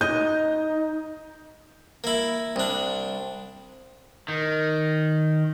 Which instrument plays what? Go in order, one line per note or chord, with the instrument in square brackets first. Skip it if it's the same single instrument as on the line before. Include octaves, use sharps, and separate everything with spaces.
[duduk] D#4 [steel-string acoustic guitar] D#5 [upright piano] G6
[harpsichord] A#3 E4
C2 D4
[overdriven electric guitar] D#3